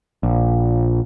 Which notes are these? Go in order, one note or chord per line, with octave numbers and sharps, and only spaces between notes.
A#1